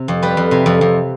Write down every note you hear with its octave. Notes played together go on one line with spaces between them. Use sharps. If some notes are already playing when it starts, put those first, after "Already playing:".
Already playing: C3
F2
G3 G4 B4
F2
C3
F2
F2